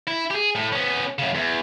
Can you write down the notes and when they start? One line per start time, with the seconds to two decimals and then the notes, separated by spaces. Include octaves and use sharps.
0.08 E4
0.31 G4 G#4
0.55 A2
0.73 B3 C#4
1.19 F#2 C#3
1.35 E2